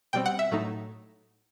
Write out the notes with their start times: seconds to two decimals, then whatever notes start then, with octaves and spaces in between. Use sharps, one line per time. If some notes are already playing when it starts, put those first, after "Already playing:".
0.13 B2 G3 C4 G5
0.26 F#5
0.39 E5
0.51 A2 F#3 A3 D#4